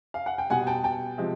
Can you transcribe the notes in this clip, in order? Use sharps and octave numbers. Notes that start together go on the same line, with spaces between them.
F5
F#5
G5
B2 G3 F#5 G#5
G5 A5
G5 A5
C3 F3 G#3